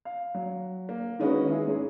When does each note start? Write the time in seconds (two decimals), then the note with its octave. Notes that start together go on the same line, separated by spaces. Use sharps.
0.05 F5
0.34 F#3
0.89 A#3
1.19 D#3 G#3 C#4 D#4 F#4 B4
1.47 G#3 D#4 E4 G#4
1.66 G#2 C#4 G#4